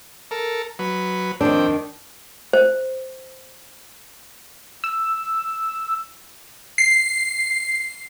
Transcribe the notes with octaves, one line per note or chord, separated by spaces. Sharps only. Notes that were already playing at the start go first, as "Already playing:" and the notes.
A4 A#4
F#3 B4
F2 D#3 C4 D4 G5
C5
E6
C7